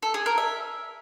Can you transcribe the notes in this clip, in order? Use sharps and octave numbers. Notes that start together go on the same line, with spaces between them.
A4
G#4
A#4
E5